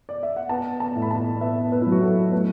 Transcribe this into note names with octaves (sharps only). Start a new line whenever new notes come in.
D5
E5
F#5
B3 A5
A5
A2
B5
A5
B3 E5
B4
E4
F#3
F#4
A4
A3 B4